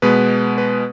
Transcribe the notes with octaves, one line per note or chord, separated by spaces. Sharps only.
B2 G#3 B3 B4
B4